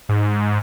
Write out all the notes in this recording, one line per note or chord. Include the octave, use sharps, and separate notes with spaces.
G#2